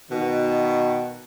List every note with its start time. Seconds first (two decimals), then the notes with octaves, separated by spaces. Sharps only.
0.11 B2 D#3